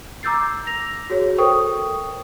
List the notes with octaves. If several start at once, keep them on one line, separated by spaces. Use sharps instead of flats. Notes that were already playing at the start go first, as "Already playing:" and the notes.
A#5 D6 E6 G6 A6 C7
A#6 F7
F#4 G#4 C#5
A4 A#4 C5 G5 C#6 D#6